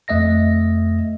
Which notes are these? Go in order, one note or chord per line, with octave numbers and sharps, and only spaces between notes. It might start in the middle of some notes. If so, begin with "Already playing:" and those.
F2 A3 D#5 E5 A#6